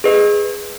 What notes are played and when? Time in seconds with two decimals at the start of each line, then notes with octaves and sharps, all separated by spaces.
0.04 G#4 B4 D#5